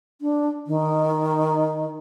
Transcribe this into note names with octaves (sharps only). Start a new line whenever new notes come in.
D4
D#3